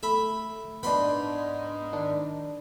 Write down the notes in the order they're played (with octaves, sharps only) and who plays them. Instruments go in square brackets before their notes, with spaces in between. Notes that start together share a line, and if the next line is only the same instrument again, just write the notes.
[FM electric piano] A3 [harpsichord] E5 B5
[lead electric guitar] G#2 D#4 [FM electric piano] B3 D4 [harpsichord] B5 C6
[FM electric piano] D#3 D4